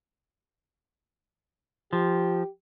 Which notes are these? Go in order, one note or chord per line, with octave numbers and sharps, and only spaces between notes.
F3 G4